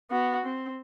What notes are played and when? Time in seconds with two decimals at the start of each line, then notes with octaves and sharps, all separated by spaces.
0.11 B3 F#4
0.46 C4